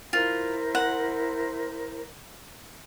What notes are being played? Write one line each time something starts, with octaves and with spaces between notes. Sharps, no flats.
E4 F4 A#4 C5
F#5